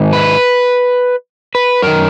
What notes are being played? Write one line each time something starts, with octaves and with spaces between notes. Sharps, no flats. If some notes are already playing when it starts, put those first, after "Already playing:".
Already playing: G#2 D#3
B4
B4
F#2 D#3 A#4